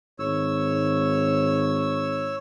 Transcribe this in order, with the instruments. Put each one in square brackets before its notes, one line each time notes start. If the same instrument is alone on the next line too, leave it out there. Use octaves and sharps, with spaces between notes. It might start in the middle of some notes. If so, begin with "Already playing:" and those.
[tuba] G#1 [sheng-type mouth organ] C#5 E6